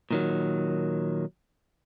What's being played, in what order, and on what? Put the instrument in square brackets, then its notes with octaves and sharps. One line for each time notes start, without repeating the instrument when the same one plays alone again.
[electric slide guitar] A#2 D#3 F#3